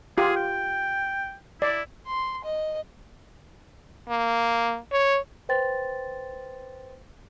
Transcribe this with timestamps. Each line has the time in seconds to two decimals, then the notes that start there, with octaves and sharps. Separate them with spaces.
0.18 F4 G4 G#4
0.36 G5
1.62 E4 D5
2.07 C6
2.44 D#5
4.09 A#3
4.92 C#5
5.49 B4 C5 G5 C6 A6